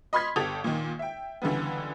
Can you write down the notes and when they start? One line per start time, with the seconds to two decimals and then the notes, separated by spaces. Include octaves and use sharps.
0.13 D#5 B5 C6 F6 G#6 B6
0.36 G1 G4 A4 D#6 G#6 F7
0.64 A#2 D#3
0.99 E5 G5
1.42 C#2 D3 E3 G3 B3